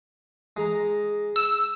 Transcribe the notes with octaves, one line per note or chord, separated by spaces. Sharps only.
G#3 A#5
E6